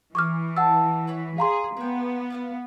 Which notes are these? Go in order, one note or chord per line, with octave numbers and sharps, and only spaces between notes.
E3 G#5 C#6 D6 F6
F#5 A5 E6
B4 C#5 B5
G#4 F5 A#5 C6
B3 G#4 G5
F4 F5 F#5